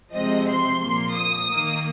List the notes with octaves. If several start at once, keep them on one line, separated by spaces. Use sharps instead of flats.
C3 F3 G#3 C4 D#5
C6
A#2 F3 A#3
D#6
D#3 A#3